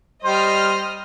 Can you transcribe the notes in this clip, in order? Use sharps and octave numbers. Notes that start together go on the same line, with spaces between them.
G3 C5 D#5 F6